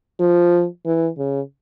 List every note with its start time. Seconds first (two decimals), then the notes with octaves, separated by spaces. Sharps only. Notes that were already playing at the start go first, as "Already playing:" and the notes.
0.20 F3
0.85 E3
1.17 C#3